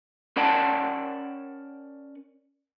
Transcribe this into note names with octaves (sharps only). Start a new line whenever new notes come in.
C#4 A#4 D5 F#5 G5 A5